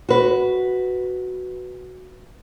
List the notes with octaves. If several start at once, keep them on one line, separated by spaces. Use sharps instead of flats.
F#4 B4